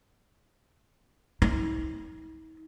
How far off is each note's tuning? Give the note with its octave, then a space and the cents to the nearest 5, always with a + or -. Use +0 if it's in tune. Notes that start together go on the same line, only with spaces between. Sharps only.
D#4 +45